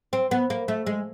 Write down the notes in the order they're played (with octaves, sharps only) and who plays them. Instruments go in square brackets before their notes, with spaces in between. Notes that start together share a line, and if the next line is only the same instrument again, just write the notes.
[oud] C4
B3
A#3
A3
G#3